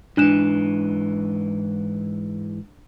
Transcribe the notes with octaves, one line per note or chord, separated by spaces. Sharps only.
G#2 E3 D4 F#6 E7